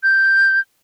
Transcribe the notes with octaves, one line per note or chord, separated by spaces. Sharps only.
G6